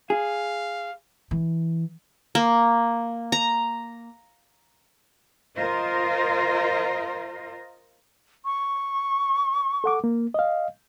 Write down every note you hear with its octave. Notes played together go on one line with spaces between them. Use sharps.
G#4 F5
E3
A#3
A#5
F4 A#4 C5 D#5
C#6
A4 F#5 D6
A#3
D#5 F5